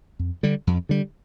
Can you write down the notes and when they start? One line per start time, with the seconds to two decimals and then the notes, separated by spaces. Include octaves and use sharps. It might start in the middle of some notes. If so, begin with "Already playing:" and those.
0.19 F2
0.43 D3 G3
0.67 F2
0.89 D3 G3